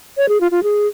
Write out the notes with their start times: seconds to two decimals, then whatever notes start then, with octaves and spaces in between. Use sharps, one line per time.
0.18 C#5
0.29 G#4
0.41 F4
0.51 F4
0.63 G#4